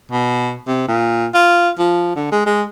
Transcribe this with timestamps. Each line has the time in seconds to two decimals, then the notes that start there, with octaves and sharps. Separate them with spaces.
0.12 B2
0.67 C3
0.88 A#2
1.34 F4
1.79 F3
2.16 D3
2.32 G#3
2.46 G#3